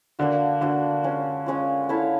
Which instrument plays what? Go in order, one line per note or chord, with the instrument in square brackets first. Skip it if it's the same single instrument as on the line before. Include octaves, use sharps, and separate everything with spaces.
[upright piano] D3 [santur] A#3 D4 F#4
[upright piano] D3 [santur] A#3 D4 F#4
[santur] G#3 C#4 F4
G#3 C#4 F4
E4 A4 C#5 F5